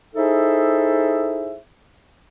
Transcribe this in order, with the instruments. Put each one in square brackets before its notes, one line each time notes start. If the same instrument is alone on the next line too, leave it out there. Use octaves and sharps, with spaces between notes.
[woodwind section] D#4 E4 G#4 A4 C5 E5